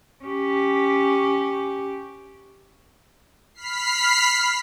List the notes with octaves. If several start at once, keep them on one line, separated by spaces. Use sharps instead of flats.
C#4 G4
B5 F6 B6 C7